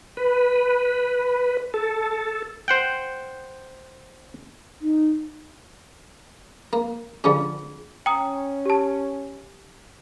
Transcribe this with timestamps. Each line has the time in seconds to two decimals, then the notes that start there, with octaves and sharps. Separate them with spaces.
0.17 B4
1.74 A4
2.68 C5 F#5 G5
4.81 D#4
6.73 A#3
7.24 D3 F3 C#4 F4 G#4
8.06 C#4 G5 A#5 D#6
8.66 G4 A5